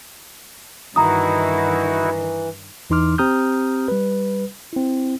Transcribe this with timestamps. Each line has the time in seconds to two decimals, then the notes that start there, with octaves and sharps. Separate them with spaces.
0.96 G2 D#3 E3 D#4 E4 F#4 A#5 D#6
2.90 E2 E3 D#4 C6 D6 F6
3.18 C4 G4 A#5 D#6 F6 G6
3.88 G3 B4
4.73 C4 E4